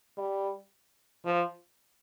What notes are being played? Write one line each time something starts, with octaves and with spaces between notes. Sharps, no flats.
G3
F3